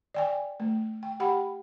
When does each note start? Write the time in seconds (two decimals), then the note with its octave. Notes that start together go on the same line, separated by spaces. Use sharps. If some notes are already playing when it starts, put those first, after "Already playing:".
0.14 D5 G5 G#5
0.60 A3
1.03 G5
1.20 G4 F#5 G5 B5